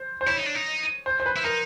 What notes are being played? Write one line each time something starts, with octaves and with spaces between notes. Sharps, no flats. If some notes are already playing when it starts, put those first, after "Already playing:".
Already playing: C5
C5
E4 C#5
D#4
D4
D#4
C5
C5
B4
E4
D#4 A#4